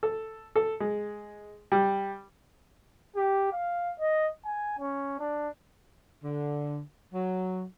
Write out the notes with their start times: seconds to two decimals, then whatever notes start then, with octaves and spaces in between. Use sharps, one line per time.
0.03 A4
0.56 A4
0.80 G#3
1.72 G3
3.16 G4
3.52 F5
4.00 D#5
4.46 G#5
4.79 C#4
5.20 D4
6.24 D3
7.14 F#3